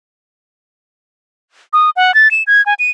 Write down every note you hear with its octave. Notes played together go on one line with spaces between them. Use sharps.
D#6
F#5
A6
E7
G#6
G#5
D#7